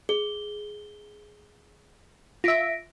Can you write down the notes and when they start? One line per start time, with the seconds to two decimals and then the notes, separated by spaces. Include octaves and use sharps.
0.09 G#4 G7
2.44 F4 E5 A#6 B6 D7